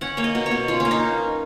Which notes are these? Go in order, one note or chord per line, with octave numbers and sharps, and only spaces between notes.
C#4 F#5
A#3 C#5
D#5
B2
C#5
B2
C#4 F4
A#3 C#4
D#4